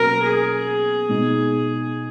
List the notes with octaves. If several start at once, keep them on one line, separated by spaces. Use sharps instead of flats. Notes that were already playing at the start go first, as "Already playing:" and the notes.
Already playing: B2 F#3 A#3 C#4 A#4
G#4
B2 G#3 D#4